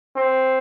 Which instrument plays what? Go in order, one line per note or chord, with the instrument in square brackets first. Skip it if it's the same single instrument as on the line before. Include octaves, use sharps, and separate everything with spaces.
[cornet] C4